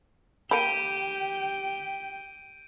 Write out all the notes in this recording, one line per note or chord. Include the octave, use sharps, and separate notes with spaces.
A#3 G4 A4 G5 B5 G6 D7 D#7